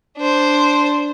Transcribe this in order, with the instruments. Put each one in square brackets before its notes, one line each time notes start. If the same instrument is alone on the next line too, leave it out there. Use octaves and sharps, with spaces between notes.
[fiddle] D4 C5